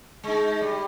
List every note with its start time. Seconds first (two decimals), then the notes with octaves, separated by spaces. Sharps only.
0.24 G#3 D#4
0.61 G3